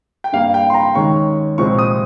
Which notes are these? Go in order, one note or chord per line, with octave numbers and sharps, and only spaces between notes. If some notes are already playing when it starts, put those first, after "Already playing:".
G5
G2 G3 A#3 F5
G5
C6
A#5
D#2 D#3 G#3 C#4 C#6
C2 A#2 F3 G#3 C4 C#6
D#6